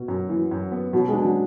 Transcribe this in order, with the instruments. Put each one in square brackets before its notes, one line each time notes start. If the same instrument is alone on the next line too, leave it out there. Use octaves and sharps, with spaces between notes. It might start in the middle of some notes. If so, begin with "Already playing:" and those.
Already playing: [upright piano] B2
[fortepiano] F#2
E3
F#2
B3
[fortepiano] B2 [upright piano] F#3
[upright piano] G#3
[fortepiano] D4
[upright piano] F#3